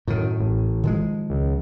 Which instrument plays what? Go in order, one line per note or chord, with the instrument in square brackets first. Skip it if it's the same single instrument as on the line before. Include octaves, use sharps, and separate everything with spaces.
[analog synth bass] F#2 [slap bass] A2 D#3
[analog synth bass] A1
[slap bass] D#3 F3 G#3
[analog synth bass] C#2